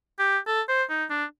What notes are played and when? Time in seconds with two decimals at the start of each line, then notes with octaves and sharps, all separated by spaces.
0.19 G4
0.47 A4
0.68 C5
0.90 D#4
1.10 D4